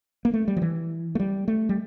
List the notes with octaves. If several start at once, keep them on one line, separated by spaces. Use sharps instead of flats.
A#3
A3
G3
F3
E3
A3
G3
A3
G3